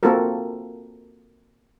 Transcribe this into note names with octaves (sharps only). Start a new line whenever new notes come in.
A#3 C4 F4 F#4 A4 A#4